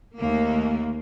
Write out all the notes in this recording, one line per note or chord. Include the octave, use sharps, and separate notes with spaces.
D#2 A3 A#3